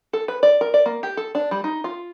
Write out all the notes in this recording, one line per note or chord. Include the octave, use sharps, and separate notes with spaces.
A4
B4
D5
A#4
D5
A#3
G4
A4
D4
G3
D#4
F4